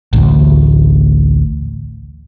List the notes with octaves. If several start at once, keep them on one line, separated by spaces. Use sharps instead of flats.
A1 D2